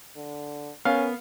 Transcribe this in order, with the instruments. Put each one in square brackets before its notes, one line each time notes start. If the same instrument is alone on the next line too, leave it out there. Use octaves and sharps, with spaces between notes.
[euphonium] D3
[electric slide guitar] B3 [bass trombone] C#4 [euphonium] A#4 [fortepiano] F5